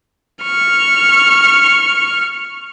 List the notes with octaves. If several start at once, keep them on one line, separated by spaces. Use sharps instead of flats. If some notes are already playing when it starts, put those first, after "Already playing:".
C#6 F6